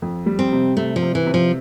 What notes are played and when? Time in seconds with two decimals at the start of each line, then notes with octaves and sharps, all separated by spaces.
0.02 F2
0.26 G3
0.39 C4
0.52 C3
0.77 C3 A3
0.96 F3
1.02 C3
1.15 E3
1.26 C3
1.34 F3